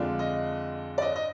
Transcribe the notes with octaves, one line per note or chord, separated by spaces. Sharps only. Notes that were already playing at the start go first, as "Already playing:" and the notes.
Already playing: F2 D3 G#3 D4 F4
D#5
D5
D#5
D#5